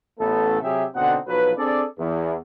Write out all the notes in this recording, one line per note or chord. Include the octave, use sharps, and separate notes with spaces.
A1 A3 B3 A4
C3 F#3 G4 G#4 E5
B2 D3 C4 D#4 F#5
B1 F3 F#3 F#4 B4
C4 D4 G#4 A4 D5
E2